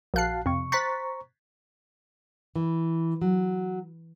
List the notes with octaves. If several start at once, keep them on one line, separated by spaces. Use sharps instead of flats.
A#1 F#4 F5 A5 F#6 C7
F2 C3 C#6
C5 A#5 C#6 F#6 A6 B6
E3
F#3